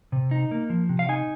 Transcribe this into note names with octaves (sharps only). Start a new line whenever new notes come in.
C3
D#4
A#3
F3
C3
F5
D#4 G#5